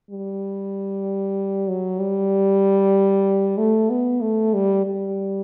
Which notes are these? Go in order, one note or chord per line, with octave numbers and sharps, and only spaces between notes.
G3
F#3
G3
A3
B3
A3
G3
G3